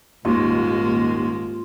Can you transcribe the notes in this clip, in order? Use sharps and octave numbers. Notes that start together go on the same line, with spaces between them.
D#1 D#2 G#2 G#3 A#3 F4